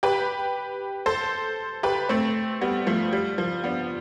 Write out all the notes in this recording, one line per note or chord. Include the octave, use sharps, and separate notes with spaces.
G4 B4
A4 C5
G4 B4
A3 C4
G3 B3
F3 A3
G3
F3
B3 D4